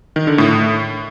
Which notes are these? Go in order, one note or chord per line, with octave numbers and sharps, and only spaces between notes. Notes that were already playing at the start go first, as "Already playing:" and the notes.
D#3
D3
A2